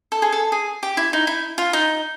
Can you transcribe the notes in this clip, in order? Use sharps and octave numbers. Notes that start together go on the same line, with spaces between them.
A4
G#4
A4
G#4
G4
E4
D#4
E4
F4
D#4